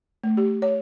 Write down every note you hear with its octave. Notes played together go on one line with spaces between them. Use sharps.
A3
G4
C#5